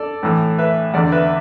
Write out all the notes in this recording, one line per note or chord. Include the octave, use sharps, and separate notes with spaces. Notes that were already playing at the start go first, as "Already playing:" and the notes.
Already playing: A4 D5
A2 E3
B4 E5
E2 D3 D5 F#5
B4 E5